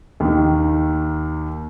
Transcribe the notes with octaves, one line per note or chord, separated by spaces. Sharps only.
D#2 D#3